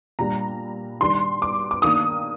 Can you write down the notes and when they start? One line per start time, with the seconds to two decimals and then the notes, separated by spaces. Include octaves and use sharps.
0.19 A#2 G3 D4 A#5
1.01 D#3 G3 D4 C6
1.42 D6
1.71 D6
1.82 D#3 A#3 D4 D#6